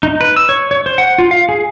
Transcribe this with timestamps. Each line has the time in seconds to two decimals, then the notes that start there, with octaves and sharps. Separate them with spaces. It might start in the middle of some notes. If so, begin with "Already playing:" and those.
0.03 D#4
0.21 B4
0.36 E6
0.49 C#5
0.71 C#5
0.86 C5
0.98 F#5
1.18 F4
1.31 F5
1.49 G#4